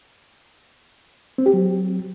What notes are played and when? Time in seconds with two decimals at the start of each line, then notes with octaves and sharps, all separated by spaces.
1.38 C4
1.46 G4
1.53 F#3